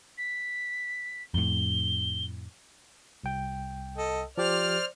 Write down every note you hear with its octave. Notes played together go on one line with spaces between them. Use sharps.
B6
F2 A2 G7
C2 G5
A4 D#5
F3 G4 C5 D5 F6